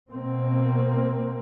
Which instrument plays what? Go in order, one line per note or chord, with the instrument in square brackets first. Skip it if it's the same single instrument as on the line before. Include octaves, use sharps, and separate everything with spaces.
[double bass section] B2 A#3 C4